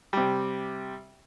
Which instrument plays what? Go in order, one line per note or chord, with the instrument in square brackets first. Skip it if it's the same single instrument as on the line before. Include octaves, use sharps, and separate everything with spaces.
[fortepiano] C3 G3